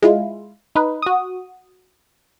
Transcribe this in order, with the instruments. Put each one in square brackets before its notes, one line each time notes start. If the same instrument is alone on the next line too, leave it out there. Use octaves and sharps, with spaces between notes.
[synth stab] G#3 E4 F4
D#4 B4
F#4 D#6